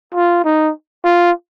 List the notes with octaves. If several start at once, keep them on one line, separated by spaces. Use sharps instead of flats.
F4
D#4
F4